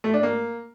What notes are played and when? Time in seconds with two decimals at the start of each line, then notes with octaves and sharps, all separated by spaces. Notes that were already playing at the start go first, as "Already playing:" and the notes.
0.04 A3
0.14 D4
0.23 A#3